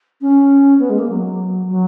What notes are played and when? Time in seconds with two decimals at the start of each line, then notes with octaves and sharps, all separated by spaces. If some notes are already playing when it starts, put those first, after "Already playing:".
0.21 C#4
0.79 B3
0.90 G#3
0.99 A#3
1.09 F#3
1.69 F#3